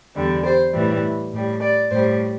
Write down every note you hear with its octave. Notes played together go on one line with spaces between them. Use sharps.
E2 D3 G3
C5
A2 E3 G3
A2 G3
D5
A2 G3 C5